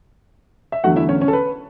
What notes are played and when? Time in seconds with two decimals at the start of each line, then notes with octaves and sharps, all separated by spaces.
0.72 E5
0.84 E2 D3 F#3 A3 F#4 F#5
0.96 E4 E5
1.09 C#4 C#5
1.21 C#4 C#5
1.28 A4
1.33 B4